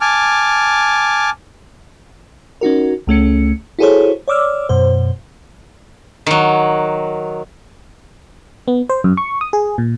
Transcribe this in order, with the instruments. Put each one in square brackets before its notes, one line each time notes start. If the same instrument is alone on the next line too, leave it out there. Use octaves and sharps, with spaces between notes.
[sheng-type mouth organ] G#5 A5 D6 F6
[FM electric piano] C#4 D#4 F#4 A#4
C#2 A3 C#4 C#7
E4 F#4 G#4 A4 C5 C#5
C#5 D5 D6 E6 F6
F#2 B2 C5
[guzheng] D#3 F#3
[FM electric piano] B3
C5
F#2
C#6
D#6
G#4
A#2